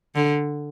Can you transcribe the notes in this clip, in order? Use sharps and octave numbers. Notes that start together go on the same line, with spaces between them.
D3